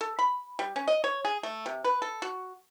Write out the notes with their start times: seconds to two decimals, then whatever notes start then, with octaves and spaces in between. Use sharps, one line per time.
0.01 A4
0.19 B5
0.59 G3
0.76 C#4
0.88 D#5
1.04 C#5
1.25 G#4
1.43 A3
1.66 C3
1.84 B4
2.02 A4
2.22 F#4